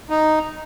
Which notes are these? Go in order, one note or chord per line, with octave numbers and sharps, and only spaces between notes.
D#4